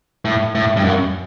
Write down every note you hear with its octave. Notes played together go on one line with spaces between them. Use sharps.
A2
A2
G2
F#2